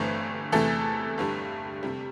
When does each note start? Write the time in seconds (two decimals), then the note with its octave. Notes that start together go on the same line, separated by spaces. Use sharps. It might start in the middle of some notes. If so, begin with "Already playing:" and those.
Already playing: G1 G2 E3 A3 C4
0.52 E2 C3 E3 A3 A4
1.18 G1 G2 G3
1.83 C3 G3